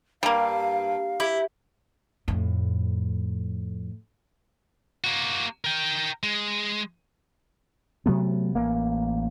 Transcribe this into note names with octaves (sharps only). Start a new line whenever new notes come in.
G2 G3 A#3 F5
E4 G4
F2 A2
A#3 F#4
A#4 G5
G#3
C3 F#3 A3 B3
A1 A#3